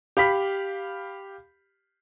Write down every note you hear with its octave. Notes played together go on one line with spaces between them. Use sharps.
G4 F5 B5 B6